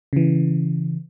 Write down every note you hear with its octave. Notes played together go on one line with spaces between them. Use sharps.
C#3 E3